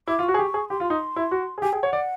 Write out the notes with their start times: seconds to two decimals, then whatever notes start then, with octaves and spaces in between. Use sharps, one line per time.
0.08 E4 D6
0.19 F4
0.23 F#4 C#6
0.34 G#4
0.39 G4
0.54 G#4
0.70 G4 C6
0.80 F4
0.90 D#4
1.16 E4
1.31 F#4
1.58 G#4
1.62 G4 G#5
1.72 G#4 G5
1.83 C#5 F#5
1.93 D5